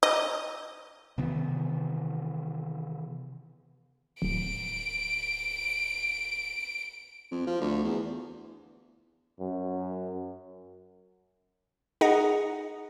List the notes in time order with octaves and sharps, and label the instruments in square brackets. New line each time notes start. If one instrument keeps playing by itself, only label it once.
[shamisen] D#5
[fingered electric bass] C3 D#3 E3 B3
[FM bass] D1 [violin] D7
[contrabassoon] F2
F3
D2
E2
[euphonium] F#2
[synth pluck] D#4 G#4 D#5 F#5 A#5